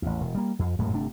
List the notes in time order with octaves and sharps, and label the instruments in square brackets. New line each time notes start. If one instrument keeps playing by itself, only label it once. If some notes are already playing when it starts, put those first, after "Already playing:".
[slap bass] A1 E2
E1
G3 A#3
F2
D#1 F#2 A2 G#3
G1 C3 A3 D4